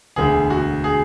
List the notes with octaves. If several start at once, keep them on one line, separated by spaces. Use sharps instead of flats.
E1 D2 D3 G#4
F#4
G#4